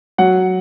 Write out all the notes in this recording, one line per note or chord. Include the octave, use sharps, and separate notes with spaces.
F#3 F#5